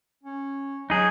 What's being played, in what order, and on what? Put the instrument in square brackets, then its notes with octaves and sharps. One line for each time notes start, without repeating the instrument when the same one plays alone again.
[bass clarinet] C#4
[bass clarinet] F#3 [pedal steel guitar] D#4 G#4